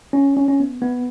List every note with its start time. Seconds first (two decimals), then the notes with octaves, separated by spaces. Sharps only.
0.13 C#4
0.37 C#4
0.48 C#4
0.60 B3
0.82 B3